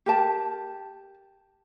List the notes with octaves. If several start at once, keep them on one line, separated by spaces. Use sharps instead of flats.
G4 A#4 A5